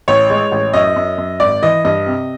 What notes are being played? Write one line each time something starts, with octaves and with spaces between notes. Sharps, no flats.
A1 C#5
G#3
A1
F#2 D#5
F#2
F#2
G#1 D5
E3 D#5
G2 D#5
C3